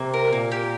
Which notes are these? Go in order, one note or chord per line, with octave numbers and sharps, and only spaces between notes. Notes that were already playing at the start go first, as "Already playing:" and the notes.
Already playing: C3 A#3
A#4
A#2 A#3
G4